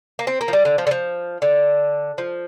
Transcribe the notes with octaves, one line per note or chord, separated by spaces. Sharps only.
A#3
C4
A#3
F3
G3
D3
F3
D3
F3
D3
F3